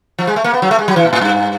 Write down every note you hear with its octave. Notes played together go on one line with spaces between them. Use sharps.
F3
G#3
A3
A#3
B3
F#3
A3
G#3
F#3
E3
A#2
A2
G2